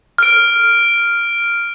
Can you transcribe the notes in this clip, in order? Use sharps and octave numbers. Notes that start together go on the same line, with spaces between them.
F6 D7